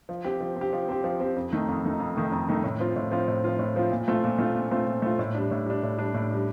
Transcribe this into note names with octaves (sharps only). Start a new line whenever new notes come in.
F3
C4 G4
F3
C4
G4
F3
C4 G4
F3
C4 G4
F2
D#3 A3 D#4
F2
D#3 A3 D#4
F2
D#3 A3 D#4
F2
D#3 A3 D#4
A2
F3 C4 F4
A2
F3 C4 F4
A2
F3 C4 F4
A2
F3 C4 F4
A#2
A3 C4 F4
A#2
A3 C4 F4
A#2
A3 C4 F4
A#2
A3 C4 F4
A2
G3 D4
A2
G3 D4
A2
G3 D4
A2
G3 D4